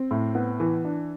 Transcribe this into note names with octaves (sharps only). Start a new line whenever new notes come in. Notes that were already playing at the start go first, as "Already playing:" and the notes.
Already playing: C4
A2
B3
E3
D4